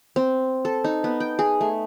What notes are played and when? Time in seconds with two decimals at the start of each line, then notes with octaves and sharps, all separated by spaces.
0.16 C4
0.65 A4
0.84 D#4
1.04 B3
1.20 G5
1.39 G#4
1.61 A3